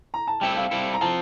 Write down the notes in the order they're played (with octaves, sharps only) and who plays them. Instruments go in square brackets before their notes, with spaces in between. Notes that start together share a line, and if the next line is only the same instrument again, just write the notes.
[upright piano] A#5
A5
[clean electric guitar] G3 C4 E4 A4 [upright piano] G5
[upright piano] F5
[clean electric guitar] G3 C4 E4 A4
[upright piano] A#5
[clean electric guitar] F3 C4 F4 [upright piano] A5